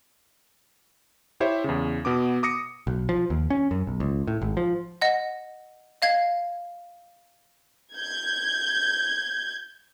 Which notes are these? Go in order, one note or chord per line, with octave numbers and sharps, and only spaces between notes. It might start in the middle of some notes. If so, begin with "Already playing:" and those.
E4 G4 C5 C#5 E5
E2 C#3
B2 B3 D6
D6 D#6 A#6 C#7
B1
F3
D#2
C#4
F#2
B1
C#2
A2
G#1
F3
D#5 F#5
D#5 F5 G#6
G6 G#6